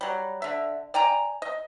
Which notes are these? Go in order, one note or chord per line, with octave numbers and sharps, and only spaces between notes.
F#3 G3
D3 E5
D5 G5 G#5 A#5
D#5